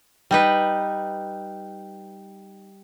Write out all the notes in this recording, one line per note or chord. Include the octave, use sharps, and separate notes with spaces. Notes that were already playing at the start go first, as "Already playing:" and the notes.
G3 D#4 B4